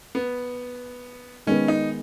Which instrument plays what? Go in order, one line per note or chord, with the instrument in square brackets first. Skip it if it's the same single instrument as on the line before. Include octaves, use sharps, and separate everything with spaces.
[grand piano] B3
[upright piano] D#3 G#3 B3 [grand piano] C#4
[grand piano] D#4